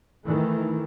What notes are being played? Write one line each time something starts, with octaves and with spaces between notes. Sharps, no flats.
D#3 E3 A3